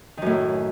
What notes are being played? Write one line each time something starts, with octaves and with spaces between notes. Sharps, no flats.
F#2 A2 D#3